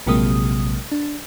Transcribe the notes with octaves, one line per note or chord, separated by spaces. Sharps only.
A#1 C3 F#3 G#3 A#3 D#6
D4